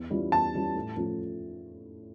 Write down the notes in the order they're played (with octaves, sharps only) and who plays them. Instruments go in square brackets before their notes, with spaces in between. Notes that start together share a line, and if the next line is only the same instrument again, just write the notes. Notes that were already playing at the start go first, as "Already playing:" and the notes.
Already playing: [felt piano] E2
E3 G3 C#4 F4
[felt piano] E2 [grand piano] A5
[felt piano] E3 G3 C#4 F4
A2
F3 A3 C#4 F4